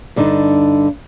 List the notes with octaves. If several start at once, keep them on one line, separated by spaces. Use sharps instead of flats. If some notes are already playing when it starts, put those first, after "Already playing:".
G2 D3 D4 D#4